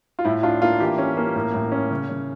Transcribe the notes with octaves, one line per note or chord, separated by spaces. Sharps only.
F4
A2 E4
D4 F4
A#3 F4
E3 G4
C#4
A#3
A2
A2
C#4
C#3
C#3